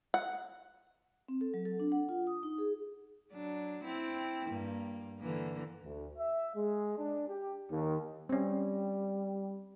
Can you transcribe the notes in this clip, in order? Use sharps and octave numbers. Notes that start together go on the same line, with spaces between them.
F#5
C4
A4
F#3
A4
D4
F#5
F4
D#6
D#4
G#4
F#3 D4
C4 E4
G2 A#3
D3 E3 A#3
D2
E5
G#3
D4
G4
D#2
G3 C4 C#4